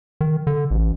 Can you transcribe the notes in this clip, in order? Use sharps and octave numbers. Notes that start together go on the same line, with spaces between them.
D#3
D3
A1